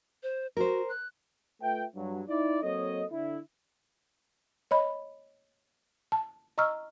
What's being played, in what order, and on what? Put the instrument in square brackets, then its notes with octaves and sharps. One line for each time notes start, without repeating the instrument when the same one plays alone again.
[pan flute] C5
[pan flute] F#4 [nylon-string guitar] A#4 C5
[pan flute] F#6
[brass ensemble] A3 F4 B4 E5 G5
G2 F#3
D#4 E4 D5
F#3 A#3 C4 A4 C#5 D#5
D3 E4
[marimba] C#5 D#5 B5
A5
D#5 A#5 C#6 E6 F6